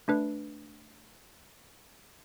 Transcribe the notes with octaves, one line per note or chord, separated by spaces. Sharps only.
A3 D4 B4